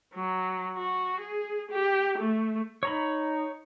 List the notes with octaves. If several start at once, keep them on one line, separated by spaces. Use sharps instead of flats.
F#3
F#4
G#4
G4
A3
D#4 C#5 A#5 B5